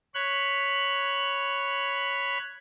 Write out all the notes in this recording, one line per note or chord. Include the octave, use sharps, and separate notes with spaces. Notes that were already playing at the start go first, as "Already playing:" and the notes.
C#5 B5 F#6